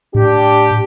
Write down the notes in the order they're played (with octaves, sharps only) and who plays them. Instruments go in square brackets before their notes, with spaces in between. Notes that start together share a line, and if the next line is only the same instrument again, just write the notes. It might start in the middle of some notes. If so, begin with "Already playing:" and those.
[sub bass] A2 [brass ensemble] D4 G4